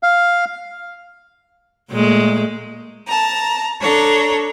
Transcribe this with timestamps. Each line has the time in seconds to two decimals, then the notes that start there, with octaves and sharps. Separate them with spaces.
0.03 F5
1.91 A#2 G#3 A3
3.06 A5 A#5
3.81 D4 A4 C#5 A#5